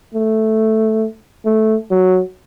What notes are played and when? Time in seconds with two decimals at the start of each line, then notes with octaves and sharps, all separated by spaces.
0.14 A3
1.46 A3
1.90 F#3